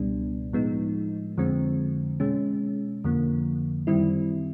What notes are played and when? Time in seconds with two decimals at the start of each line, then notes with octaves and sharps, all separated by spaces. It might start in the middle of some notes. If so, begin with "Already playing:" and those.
Already playing: C#2 B2 G3 B3 D4
0.53 A2 F3 G#3 B3 D#4
1.38 F2 D3 F3 G#3 C4
2.20 B2 G#3 C#4
3.04 F2 D3 F3 A#3
3.87 F#2 D#3 G3 C4 E4